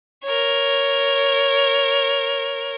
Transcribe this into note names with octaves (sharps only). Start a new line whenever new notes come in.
A#4 C#5